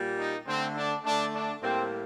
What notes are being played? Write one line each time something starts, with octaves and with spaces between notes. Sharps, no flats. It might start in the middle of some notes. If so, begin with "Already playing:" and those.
Already playing: A#2 G3 A#3
D#4
D3 A3 C4
D4
D3 A3 D4
D4
A2 G3 A#3 C4